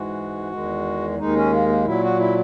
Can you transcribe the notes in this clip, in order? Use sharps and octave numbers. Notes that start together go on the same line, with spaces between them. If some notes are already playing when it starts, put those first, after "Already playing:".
Already playing: G#2 E3 G#3 F#4
E2 D#3 G#3
D#2 D#3 G#3 D#4
C#4
A#3
A#3
A#2 F#3 E4
F#4
E4